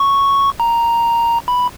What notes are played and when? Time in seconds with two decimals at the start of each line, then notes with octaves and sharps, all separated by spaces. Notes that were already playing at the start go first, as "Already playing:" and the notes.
Already playing: C#6
0.60 A#5
1.48 B5